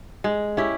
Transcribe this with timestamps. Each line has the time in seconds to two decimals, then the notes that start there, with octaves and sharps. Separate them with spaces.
0.24 G#3
0.57 C#4 E4 G4